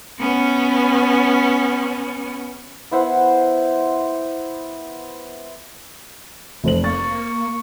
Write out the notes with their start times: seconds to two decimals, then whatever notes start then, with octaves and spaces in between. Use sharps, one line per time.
0.19 B3 C#4
2.91 B3 E4 C5 F#5
6.64 F1 C5 F#7
6.84 A#3 C#6 A6